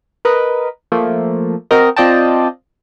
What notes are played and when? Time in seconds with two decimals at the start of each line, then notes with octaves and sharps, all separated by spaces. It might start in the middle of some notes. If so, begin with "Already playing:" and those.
0.25 A#4 B4 D#5
0.92 F3 A3 A#3
1.71 C4 F#4 A#4 D#5
1.96 C4 F4 D5 D#5 G5 A5